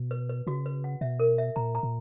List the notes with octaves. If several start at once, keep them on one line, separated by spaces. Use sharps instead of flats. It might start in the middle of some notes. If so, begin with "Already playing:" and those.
Already playing: B2
B4
B4
C#3 F#4
B4
F#5
B2 E5
A#4
E5
A#2 A#5
A#5
A#2